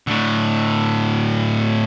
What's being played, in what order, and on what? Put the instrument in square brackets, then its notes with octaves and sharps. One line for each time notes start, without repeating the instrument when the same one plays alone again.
[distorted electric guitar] A2 D3